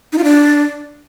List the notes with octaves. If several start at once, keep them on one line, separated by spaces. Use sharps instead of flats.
D#4
F4
D4